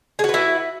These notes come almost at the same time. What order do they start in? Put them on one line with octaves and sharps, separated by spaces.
G#4 F#4 B4 E4